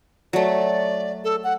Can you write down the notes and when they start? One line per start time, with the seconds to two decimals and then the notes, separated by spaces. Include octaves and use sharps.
0.33 F#3 A3 D5
1.24 A4
1.44 F#5